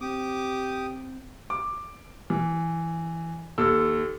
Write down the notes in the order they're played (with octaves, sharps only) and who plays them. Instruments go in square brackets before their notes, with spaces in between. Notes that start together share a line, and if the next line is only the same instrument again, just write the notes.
[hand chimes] C4 [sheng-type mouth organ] G4 D6 D#6
[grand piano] D6
E3
D#2 A4 E6